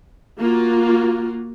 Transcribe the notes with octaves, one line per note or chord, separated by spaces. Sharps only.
A#3 F4 F#4